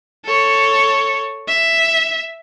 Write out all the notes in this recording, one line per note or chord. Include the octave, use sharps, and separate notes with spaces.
A4 C#5
E5